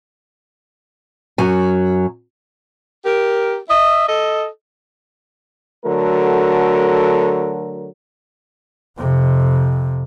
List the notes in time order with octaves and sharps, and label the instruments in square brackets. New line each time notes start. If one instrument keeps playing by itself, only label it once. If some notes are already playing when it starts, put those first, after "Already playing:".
[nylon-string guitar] F#2 F#3 G#5
[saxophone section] G4 A#4
D#5 E5
A4 D#5
[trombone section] D3 F#3 A3 F#4 A#4
[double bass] F2 C3